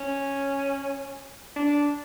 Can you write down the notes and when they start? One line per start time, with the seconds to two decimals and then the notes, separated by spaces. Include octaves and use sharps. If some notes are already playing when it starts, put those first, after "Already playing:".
Already playing: C#4
1.56 D4